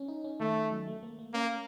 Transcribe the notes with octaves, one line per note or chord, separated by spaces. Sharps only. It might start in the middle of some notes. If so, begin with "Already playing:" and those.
Already playing: C#4
D#4
C#4
D#3 A3
F#3
A3
A#3
A#3
A#3 C#4